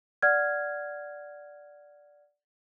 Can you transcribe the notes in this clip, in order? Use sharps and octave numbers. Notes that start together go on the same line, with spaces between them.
D5 F#5 F6 G#6